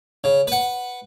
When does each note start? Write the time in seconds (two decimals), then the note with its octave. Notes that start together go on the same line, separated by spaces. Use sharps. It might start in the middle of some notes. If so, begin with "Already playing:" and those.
0.24 C#3
0.47 B4 F#5